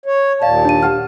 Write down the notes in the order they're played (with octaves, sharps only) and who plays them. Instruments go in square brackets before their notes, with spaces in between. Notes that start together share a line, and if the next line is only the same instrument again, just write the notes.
[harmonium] C#5
[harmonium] D#2 A#2 A5 [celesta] D5 F5
[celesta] D4 D#7
G4 F#5 F6